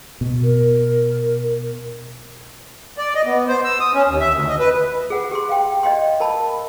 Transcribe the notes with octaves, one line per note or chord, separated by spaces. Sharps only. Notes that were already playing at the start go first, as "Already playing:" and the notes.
B2
A#4
D5
D#5
B3
C5
E6
D#6
C#4
D#2
E5
D2
D#5
B4
G#4 F#5
G4 G#4 C6
F5 G5
D5 D#5 F5 G5 C6
A#4 A5 B5